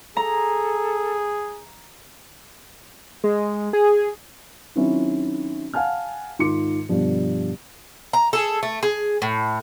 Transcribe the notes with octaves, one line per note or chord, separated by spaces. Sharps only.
G#4 A4 A#5
G#3
G#4
D#3 F#3 C4 C#4 E4
F5 F#5 G#5 A5 F6
G#2 D#3 F4 C6 D6 C#7
G2 B2 D3 F3 G3
A#5
G#4 A4
A3
G#4
A2